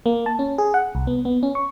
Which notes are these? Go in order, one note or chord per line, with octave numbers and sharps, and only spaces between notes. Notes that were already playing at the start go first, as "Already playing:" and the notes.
A#3
A5
C#4
G#4
F#5
C2
B3
B3
C#4
C#6